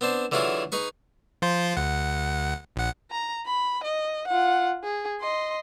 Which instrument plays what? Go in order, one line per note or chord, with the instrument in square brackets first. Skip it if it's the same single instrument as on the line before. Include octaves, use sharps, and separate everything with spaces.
[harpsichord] B3 C4 D4 C5
D3 E3 F#3 E4 F4 G#4
D#4 G#4 B4 C#6
[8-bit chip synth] F3 F4 C5
D2 F#5
A#1 F#5
[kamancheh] A#5
B5
D#5
F4 F#5
G#4
D#5 C6